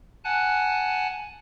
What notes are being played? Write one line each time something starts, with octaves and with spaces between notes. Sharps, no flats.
F#5 G#5 A5 F#6